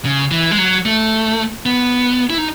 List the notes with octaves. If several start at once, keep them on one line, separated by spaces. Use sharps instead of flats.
C#3
E3
G#3
F#3
A3
B3
E4
D#4